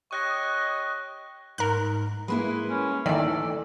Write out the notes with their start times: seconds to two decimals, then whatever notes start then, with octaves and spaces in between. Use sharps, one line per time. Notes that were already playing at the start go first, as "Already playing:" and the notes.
0.11 G4 C#5 D#5 C#6 F#6 A#6
1.58 G#2 A#4 F#6
2.28 G#3 A#3 E4 B4
2.70 C#4
3.06 D2 D#3 E3 A4 D5